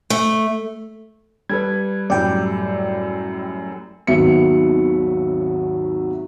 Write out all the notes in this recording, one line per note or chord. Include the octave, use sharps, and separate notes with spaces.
A3
G3 A4 B4 G#6
F#2 A2 G3 D5 G5
G#1 D#2 F#3 B3 E5 C#7